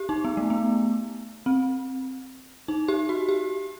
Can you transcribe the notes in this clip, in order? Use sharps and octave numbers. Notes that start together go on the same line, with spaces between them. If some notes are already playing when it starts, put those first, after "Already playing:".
Already playing: G4
D#4
B3
A3
B3
C4
D#4
G4
F#4
G4